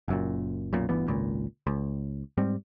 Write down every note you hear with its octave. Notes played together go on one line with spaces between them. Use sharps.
F#1 F#2 A#2
B1 F#2 A#2
G1 D2 E3 B3
G#1 C#2 A#2
C#2
G#2 G3 C4